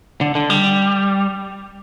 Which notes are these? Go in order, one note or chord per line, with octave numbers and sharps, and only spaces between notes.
D3
D3
G3